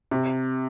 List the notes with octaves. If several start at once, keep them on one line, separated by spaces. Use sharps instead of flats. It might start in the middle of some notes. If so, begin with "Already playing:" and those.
C3